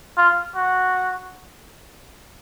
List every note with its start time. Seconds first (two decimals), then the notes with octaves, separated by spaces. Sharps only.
0.17 F4
0.55 F#4